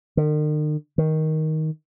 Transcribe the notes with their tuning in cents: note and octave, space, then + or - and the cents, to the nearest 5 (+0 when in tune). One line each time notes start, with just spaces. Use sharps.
D#3 -45
D#3 +10